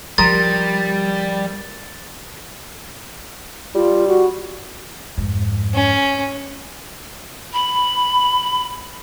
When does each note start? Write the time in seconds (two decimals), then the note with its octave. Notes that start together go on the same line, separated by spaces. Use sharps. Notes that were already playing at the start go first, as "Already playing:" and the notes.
0.18 F3 G3 A#4 C6 D#6 A6
3.75 G3 F4
4.08 F#4
5.18 F2 G#2
5.74 C#4
7.53 B5